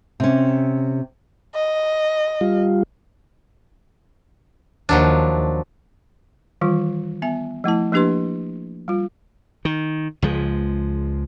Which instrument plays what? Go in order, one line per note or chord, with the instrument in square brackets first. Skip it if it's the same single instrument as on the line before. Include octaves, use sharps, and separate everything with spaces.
[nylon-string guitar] C3 C#4
[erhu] D#5
[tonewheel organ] G3 F4
[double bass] D#2 [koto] F3 F#3 D4
[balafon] D#3 E3 G3 F4
B3 E5 G#5
F3 A3 E4 A5
F3 A#3 D4 G4 B4 C6
G3 F4
[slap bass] D#3
C#2 F3 G#3